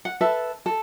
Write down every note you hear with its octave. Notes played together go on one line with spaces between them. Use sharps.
F#5
A4 B4 E5 A5
A4